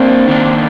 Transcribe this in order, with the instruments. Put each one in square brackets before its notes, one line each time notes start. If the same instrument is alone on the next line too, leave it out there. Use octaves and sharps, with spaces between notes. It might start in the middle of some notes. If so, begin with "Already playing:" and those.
Already playing: [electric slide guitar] A#3 D4 [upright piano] C4
[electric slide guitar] D#3 A#3 D4